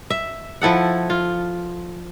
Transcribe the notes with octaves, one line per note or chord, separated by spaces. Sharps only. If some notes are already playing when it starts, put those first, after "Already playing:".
E5
F3 E4 A4 F#5
F4